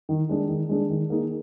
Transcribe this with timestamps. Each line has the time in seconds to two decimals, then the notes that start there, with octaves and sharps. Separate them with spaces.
0.09 D#3
0.29 G#3 D4 G#4
0.49 D#3
0.69 G#3 D4 G#4
0.90 D#3
1.10 A#3 D#4 G#4